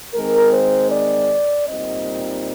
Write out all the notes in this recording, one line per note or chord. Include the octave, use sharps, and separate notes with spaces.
D#3 G#3 C4 A#4
C5
D5
A#2 G3 C4 D#4 D#5